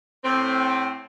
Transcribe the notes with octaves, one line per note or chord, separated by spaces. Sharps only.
A2 C4